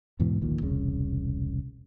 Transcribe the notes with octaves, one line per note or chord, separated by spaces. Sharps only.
E2 G#2 B2 E3
D1 A#1 A#2 D#3
E1 C2 C#3